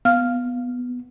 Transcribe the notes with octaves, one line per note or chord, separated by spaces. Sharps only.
B3 F5 F6